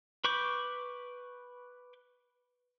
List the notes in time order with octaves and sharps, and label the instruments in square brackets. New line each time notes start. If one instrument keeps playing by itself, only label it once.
[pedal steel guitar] B4 B5 C#6 D6 G6